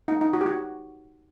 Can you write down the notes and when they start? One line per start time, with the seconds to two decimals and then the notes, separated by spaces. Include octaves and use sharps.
0.08 D#4
0.21 D#4
0.33 F#4
0.41 G4
0.46 F#4